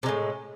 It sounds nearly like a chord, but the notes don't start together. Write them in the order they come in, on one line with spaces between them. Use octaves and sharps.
C3 G#3 A2